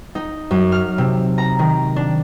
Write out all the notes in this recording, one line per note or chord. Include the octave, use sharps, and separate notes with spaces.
D#4
F#2
F6
C3
A#5
D#3
D4